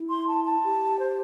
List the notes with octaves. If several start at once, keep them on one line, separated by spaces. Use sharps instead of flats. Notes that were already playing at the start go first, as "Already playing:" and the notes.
Already playing: E4
C6
A5
A5
G4
C5